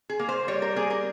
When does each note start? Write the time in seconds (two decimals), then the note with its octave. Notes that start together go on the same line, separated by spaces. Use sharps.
0.10 G#4
0.20 A#3
0.29 C5
0.48 G3 C#5
0.62 A#4
0.76 A#3 G#4
0.90 A#4